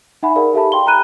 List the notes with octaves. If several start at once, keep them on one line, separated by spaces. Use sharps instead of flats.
D#4 E5 F#5 G#5 B5
G#4 A#4 D5 F5 B5
G4 A4 E5 F5 A5 B5
A4 G5 C6 G7
G#5 A#5 B5 F#6 D#7